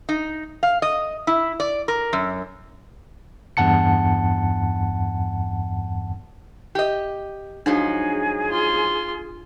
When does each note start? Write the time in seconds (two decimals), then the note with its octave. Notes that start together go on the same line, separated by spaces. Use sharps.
0.09 D#4
0.63 F5
0.82 D#5
1.27 E4
1.60 D5
1.88 A#4
2.13 F#2
3.57 E2 G2 F#5 A5 C#7
6.75 G4 D#5
7.66 G#2 F3 F#3 D4 D#4 G#4
8.49 F4 C6